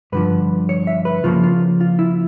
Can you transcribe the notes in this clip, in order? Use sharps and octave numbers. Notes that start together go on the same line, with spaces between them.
G2 D3 F3 B4
C#5
E5
B4
C#3 F3 A#3 F4
F4
F4
E4